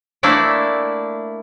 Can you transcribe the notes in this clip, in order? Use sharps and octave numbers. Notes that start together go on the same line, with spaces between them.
A3 A#3 D4 E4 D5 G5